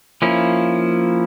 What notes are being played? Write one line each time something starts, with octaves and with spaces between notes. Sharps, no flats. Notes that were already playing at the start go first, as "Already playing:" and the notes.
F3 A#3 C#4 E4